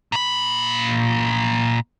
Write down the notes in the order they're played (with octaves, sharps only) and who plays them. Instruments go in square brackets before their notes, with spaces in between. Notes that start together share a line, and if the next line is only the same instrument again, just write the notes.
[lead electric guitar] A#2 B5